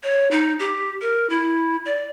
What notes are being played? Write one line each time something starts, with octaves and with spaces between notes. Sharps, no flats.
C#5
D#4
G4
A#4
E4
D5